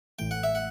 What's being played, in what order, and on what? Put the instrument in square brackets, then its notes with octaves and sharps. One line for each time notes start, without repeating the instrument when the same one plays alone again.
[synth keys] A1 A2 E3 A3 [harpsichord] G5
[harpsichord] F#5
E5
F#5